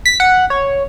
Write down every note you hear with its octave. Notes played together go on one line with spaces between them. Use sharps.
B6
F#5
C#5